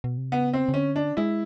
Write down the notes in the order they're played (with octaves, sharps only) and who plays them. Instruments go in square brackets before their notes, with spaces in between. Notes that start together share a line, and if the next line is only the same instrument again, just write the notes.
[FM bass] B2
C3
[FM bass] C#3 [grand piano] B3
[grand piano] C4
[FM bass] C#3
[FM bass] D3 [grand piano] C#4
[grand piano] D4
[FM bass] G#3 [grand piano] E4